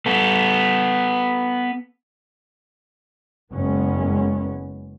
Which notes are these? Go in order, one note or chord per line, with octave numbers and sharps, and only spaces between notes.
B3 A4
F#1 G#3 B3 C#4